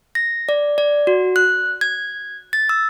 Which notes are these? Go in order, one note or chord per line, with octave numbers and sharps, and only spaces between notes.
A#6
D5
D5
F#4
F#6
G#6
A6
E6